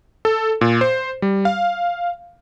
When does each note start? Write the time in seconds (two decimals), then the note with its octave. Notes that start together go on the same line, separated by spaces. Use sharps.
0.25 A4
0.61 A#2
0.81 C5
1.22 G3
1.45 F5